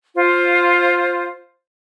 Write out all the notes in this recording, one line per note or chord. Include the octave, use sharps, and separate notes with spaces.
F4 C5